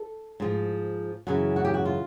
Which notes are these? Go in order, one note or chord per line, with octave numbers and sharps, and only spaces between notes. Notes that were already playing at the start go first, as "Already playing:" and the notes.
Already playing: A4
G#2 F3
F#2 C#3 E3 F#4
F#4
G4
F#4
F4